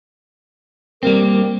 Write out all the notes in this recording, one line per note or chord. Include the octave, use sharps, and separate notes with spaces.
G3 A#3 C4 A#4